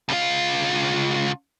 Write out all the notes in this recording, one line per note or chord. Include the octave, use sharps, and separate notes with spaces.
C#2 F4